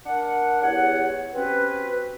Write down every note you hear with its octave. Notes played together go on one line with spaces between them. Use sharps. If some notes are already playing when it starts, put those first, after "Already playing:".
D4 A#4 F#5
E2 G4 C#5 F#5
C4 C#4 F#4 G4 B4